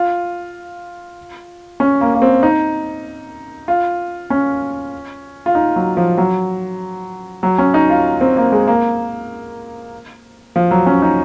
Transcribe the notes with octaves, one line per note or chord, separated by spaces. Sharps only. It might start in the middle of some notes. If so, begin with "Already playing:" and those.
Already playing: F4
C#4
A#3
A#3
C4
D#4
F4
C#4
F4
D#4
F#3
F3
F#3
F#3
C#4
D#4
F4
C4
A#3
G#3
A#3
F3
F#3
C#4
D#4